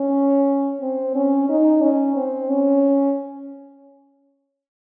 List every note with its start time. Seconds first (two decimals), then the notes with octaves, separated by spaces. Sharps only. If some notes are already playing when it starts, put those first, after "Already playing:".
Already playing: C#4
0.81 C4
1.15 C#4
1.49 D#4
1.82 C#4
2.16 C4
2.49 C#4